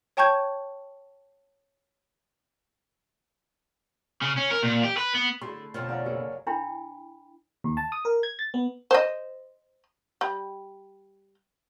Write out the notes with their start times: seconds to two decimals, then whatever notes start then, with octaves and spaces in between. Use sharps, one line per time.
0.17 C#5 G5 A5 C#6 G6 G#6
4.22 C#3
4.37 C#4
4.50 A#4
4.63 A#2
4.83 G4
4.97 B4
5.14 B3
5.41 D3 A3 E4 G#4 C6
5.74 F2 B2 D3 C4 C#4 F4
5.89 F3 C#4 D5 F5 F#5 A#5
6.06 F#1 F#3 A#3 G#4 A4
6.47 D4 E4 G5 B5
7.64 D#2
7.77 A5
7.92 D#6
8.05 A#4
8.23 G#6
8.39 A6
8.54 B3
8.91 C5 D#5
10.21 G3